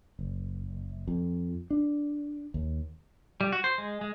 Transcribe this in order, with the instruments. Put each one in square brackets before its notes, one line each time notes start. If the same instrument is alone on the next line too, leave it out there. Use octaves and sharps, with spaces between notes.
[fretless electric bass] F#1
F2
D4
D#2
[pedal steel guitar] G3
F#4
C5
G#3
G#3